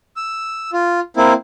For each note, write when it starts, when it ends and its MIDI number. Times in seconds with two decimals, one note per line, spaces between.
0.16 0.70 88
0.73 1.00 65
1.17 1.33 58
1.17 1.33 60
1.17 1.33 64